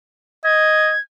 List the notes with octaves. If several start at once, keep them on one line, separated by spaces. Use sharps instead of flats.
D#5 G#6